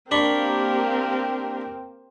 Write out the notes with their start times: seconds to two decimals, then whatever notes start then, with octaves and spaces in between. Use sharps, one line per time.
0.11 A#3 C4 D4 G4 A#4 B5 C#6